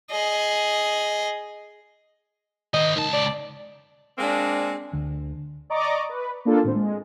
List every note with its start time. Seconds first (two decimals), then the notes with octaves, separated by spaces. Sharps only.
0.11 G#4 D#5
2.74 D#3 C5 D#5
2.96 C#2 D#3 A5
3.13 D5
4.18 G#3 A#3 C4 D4
4.93 D2
5.70 D5 D#5 A#5 C#6 D6
6.09 B4
6.45 A#3 D4 F4 A4
6.63 G#1 A2 C4 C5
6.75 G#3